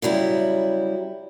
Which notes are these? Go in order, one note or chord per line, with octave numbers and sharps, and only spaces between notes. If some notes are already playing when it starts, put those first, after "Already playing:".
C#3 F#3 G3 E4